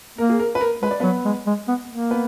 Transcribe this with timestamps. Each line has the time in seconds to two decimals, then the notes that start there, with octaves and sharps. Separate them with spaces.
0.18 A#3 A#4
0.29 G#4
0.39 A#4
0.55 B4
0.61 A#4
0.82 G#3 B4
0.91 D5
1.00 F#3 B3 B4
1.25 G#3
1.47 G#3
1.68 B3
1.90 A#3
2.11 B3 B4